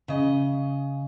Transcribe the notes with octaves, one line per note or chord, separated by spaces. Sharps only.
C#3 D#5